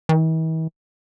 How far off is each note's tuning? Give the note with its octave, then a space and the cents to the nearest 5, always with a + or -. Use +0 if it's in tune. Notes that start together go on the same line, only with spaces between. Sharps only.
E3 -45